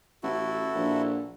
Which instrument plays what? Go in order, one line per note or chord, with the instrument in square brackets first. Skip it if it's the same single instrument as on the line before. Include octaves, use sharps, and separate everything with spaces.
[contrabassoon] A1 [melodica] E4 F#4 A4
[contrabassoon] A#1